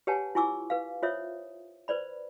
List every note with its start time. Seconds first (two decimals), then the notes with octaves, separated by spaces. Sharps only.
0.07 G4 B4 C#5 F#5 G#5 A5
0.35 E4 F4 G#5 C#6 D6 E6
0.70 B4 F5
1.03 F4 C5 C#5 E5 D#6
1.88 B4 C5 D5 B5